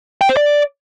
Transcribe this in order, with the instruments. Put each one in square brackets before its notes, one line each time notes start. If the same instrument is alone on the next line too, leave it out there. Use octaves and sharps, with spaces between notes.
[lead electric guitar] G5
C5
D5